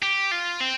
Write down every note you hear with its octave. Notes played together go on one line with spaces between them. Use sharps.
G4
F4
C4